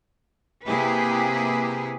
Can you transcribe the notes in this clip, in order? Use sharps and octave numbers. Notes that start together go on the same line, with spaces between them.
C3 A#3 E4 G4 G#4 B4